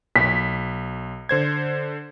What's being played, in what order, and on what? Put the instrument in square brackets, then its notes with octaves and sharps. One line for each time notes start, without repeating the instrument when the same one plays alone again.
[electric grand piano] B1 [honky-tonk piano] B6
[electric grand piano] D3 C5 G#6